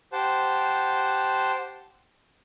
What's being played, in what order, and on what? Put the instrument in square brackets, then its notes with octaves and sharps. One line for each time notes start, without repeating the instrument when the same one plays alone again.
[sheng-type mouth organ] G4 C5 F#5 A5